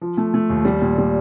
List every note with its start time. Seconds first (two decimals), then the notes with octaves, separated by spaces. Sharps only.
0.01 F3
0.17 A3
0.34 A3
0.49 D#2
0.65 G3
0.81 A#2
0.98 G3